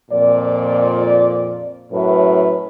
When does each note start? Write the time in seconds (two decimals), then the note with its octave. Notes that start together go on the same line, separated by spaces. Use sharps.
0.11 F2 A#2 D5
1.91 F#2 A2 B4